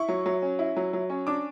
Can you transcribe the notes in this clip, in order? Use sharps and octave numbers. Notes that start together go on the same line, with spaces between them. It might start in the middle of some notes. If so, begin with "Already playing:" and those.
Already playing: E4 C#6
F#3
F#3
C#4
E4
F#3
F#3
C#4
D4 D6